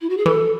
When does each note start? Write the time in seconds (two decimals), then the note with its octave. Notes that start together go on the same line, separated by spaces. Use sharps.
0.01 E4
0.09 F#4
0.17 G#4
0.26 E3 A4